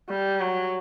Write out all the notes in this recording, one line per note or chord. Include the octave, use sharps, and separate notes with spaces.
G3
F#3